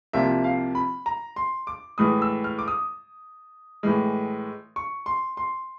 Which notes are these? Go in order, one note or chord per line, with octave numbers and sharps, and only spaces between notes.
C2 C3 F3 A#3 E5
F5
B5
A#5
C6
D6
A2 E3 G#3 D#6
E6
F6
D6
D#6
A2 E3 G#3
C#6
C6
C6